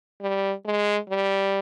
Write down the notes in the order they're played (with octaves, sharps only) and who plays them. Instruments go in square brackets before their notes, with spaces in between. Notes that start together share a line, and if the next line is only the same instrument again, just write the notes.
[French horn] G3
G#3
G3